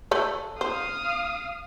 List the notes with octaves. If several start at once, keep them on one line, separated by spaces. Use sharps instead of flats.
A3 A4
C5 F5 D#6